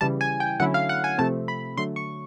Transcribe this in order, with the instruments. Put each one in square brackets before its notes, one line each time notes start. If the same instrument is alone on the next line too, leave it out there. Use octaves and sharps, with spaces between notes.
[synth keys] C#3 E3 G3 A5
G#5
G5
D3 F#3 A3 C#4 E4 F#5
F5
F#5
G#5
C3 F3 A3 C4 A5
B5
D3 F#3 A3 C6
C#6